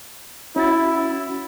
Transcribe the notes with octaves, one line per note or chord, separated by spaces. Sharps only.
C#4 E4 F#4 A6